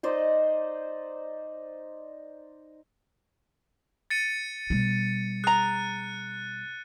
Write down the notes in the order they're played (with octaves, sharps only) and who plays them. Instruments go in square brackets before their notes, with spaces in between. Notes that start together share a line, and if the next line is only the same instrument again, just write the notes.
[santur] D#4 C5 D5 D#5
[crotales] A6 C#7 D#7
[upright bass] B2 G3
[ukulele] G#4 A#5 [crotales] F#6